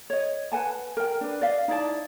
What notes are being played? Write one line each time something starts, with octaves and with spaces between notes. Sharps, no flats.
C#5 D#5
B4 F#5 G#5 A5
A#4 G5
D4 B4
D5 D#5 F5
D#4 E4 D5 A5